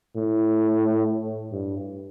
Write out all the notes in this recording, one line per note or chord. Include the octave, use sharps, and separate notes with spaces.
A2
G2